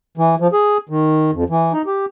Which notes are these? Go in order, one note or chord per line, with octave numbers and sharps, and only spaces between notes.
E3
F3
G#4
D#3
F2
E3
D#4
G4